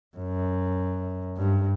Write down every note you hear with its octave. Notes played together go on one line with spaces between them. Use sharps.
F#2
G2